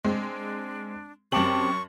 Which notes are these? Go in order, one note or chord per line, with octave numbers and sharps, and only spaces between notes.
G#3 C4 D4
F#2 C4 G4 A5 C#6 F#7